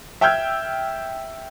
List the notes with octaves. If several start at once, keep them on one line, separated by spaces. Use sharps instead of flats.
E5 G5 E6 F6 G6 G#6